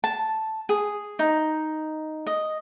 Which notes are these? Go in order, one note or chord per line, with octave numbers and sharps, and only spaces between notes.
A5
G#4
D#4
D#5